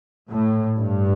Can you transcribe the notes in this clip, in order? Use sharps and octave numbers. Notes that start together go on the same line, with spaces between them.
A2
G2